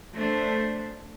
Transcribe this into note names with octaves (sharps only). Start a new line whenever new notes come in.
A3 D4 C5